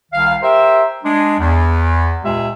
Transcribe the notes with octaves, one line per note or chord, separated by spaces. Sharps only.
C2 D#3 F5
G4 A#4 C5 E5
G#3 D4
E2
C#2 A#2 G#3 G4 E5